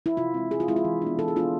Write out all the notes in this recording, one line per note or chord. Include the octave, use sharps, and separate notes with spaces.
E4
C3 F4
G#3 C4
C3 G#4
F4
G#3 C4 E4
F4
E3
B3 D4
E3 A4
G#4
B3 D4 F4